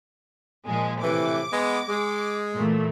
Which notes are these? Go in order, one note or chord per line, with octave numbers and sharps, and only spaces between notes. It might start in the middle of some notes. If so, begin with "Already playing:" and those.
A#2 F3 G#3
A2 C3 E3 D6
G#3 B3
G#3
A#2 E3 A3